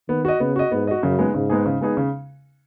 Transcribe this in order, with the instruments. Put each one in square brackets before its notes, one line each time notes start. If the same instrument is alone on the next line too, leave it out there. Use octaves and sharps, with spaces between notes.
[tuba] D#3 [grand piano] B3
[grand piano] F#4 D#5
[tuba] C#3 [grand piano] B3
[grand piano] F#4 D#5
[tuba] G#2 [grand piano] B3
[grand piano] F#4 D#5
[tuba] F#2 [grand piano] C#3
[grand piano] G#3 B3 D#4 G#4
[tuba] G#2 [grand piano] C#3
[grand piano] G#3 B3 D#4 G#4
C#3
G#3 B3 D#4 G#4
C#3